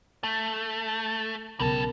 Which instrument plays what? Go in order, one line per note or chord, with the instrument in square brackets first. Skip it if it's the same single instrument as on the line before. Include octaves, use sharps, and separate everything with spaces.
[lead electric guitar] A3
[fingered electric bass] B1 C#3 [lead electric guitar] G3 A4 [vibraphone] B3 A#4